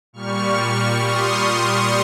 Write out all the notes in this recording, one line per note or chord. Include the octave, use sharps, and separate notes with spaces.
A#2 G3 C#6 F6
C6 D#6